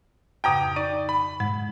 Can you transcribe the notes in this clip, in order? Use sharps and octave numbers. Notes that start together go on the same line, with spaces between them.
F2 G#2 C#3 G5 A#5 D#6
D#4 D5
B5
G#2 G#3